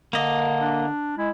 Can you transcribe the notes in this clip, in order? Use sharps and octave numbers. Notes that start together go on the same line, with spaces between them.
D3 A#3 D#5
D4
G#3 E4